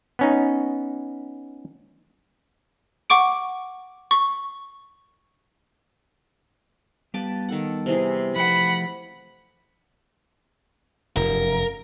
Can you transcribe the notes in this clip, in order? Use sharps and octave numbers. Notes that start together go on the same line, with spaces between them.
B3 C#4 D#4
F#5 C#6 D6 D7
C#6
G3 B3 G4 B4 F5 A5
D#3 A4 F#5
C3 E3 G#4
F3 A3 C5 F#5 B5
F1 F#2 A#4